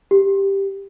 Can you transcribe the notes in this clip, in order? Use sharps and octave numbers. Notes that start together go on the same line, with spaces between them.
G4